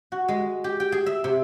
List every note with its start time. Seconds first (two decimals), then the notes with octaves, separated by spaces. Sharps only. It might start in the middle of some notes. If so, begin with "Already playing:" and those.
0.12 F#4
0.28 G#3
0.64 G4
0.80 G5
0.92 G#4
1.06 E5
1.24 C3